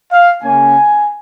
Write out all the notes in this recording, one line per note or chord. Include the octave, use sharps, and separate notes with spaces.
F5
C#3 A#3 C#4 G#5